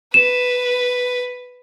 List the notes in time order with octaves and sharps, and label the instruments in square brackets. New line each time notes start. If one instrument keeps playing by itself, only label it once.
[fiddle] B4 [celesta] E7